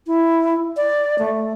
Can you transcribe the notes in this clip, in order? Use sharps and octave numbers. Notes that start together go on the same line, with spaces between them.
E4
D5
A3